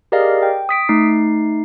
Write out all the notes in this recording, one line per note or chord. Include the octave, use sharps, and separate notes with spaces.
G4 G#4 A#4 D5 D#5 F5
G5
D#6 B6 D7
A3 D#4 C7